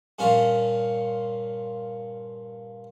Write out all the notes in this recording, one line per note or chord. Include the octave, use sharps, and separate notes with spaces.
G2 A#2 C#4 F4